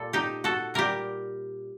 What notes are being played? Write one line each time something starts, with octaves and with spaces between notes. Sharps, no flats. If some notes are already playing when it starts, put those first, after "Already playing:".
Already playing: A#2 G3 A4
D#4 G4
F#4 A4
A#2 G3 G4 A#4